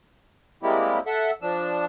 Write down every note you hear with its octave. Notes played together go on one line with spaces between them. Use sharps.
G3 G#3 A#3 C4 E4 G4
A4 E5 F#5
F3 D4 E6